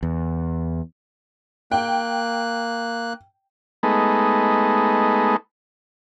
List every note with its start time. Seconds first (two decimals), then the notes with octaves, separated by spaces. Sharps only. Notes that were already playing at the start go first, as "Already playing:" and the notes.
0.03 E2
1.72 A#3 G5 F#6
3.83 G#3 A3 B3 D#4